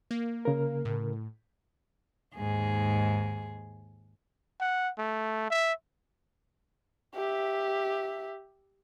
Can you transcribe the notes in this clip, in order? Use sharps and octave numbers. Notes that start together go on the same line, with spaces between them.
A#3
C#3 A#4
A2
D#2 G#2 G#4
F#5
A3
E5
G4 E5